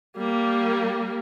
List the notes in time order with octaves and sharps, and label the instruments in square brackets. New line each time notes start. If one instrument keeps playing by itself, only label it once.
[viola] G3 A#3